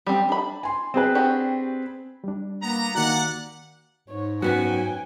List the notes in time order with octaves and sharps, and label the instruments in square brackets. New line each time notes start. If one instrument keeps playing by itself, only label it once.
[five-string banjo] G3 C4
D4 B5
[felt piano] G#5 C6
C4 G#4 B4
[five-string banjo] D4 F#4 G4
[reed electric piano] G3 D4
[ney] A#3 [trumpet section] B3 A#5
[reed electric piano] D#3 F#4 [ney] A#3 [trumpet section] G4 D5 F#5
[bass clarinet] G#2 [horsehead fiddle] C#5
[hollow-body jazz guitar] F#2 B3 C#4 [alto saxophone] F#4 [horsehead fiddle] G5 G#5